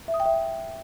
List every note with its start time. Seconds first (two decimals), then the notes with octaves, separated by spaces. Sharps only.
0.08 E5
0.14 D#6
0.20 G5
0.26 E5